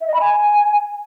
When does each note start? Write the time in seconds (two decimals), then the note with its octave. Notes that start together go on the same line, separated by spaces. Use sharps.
0.01 E5
0.07 D#5
0.14 B5
0.21 G#5